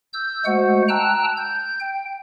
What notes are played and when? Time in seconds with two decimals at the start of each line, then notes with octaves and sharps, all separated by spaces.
0.13 E6 G6
0.45 G#3 A3 F#4 C5 F#5
0.89 G5 A5 A#5 E6 F#6
1.37 G6
1.80 G5